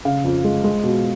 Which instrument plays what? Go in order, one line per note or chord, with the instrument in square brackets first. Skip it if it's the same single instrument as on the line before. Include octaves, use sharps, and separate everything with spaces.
[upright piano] C#3 F5
F2
G#3
G#3
B2